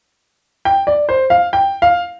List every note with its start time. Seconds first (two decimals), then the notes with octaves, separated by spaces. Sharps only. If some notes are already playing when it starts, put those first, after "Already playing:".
0.65 G5
0.87 D5
1.09 C5
1.30 F5
1.53 G5
1.82 F5